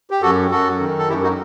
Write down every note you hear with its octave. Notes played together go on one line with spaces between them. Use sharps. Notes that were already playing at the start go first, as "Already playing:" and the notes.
G4
F#2 F#4 A4
F#2 F#4 A4
D#3
A4
F#2 E4 G4
D#4 F#4